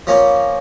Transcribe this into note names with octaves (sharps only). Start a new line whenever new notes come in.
F3 A#3 C#4